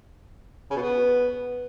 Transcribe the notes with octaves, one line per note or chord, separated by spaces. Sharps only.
C#3
B2
B3